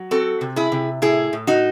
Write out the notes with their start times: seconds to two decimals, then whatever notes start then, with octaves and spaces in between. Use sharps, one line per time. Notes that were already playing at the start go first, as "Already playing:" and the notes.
Already playing: F#3
0.11 C4 F#4 A4
0.41 C3
0.56 E4 G#4
0.72 C3
1.02 A2 E4 G#4
1.33 A2
1.47 D#4 F#4